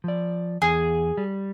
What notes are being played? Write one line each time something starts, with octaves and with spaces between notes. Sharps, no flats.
F3 D5
E2 G#4
G3